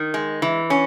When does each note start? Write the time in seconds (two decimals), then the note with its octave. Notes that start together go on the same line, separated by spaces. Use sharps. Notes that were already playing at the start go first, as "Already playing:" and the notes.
Already playing: D#3
0.14 G#3
0.42 E3
0.70 C#4